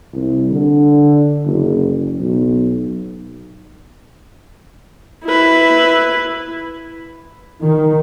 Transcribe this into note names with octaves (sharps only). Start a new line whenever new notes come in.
C2
D3
F#1
B1
E4 B4
D#3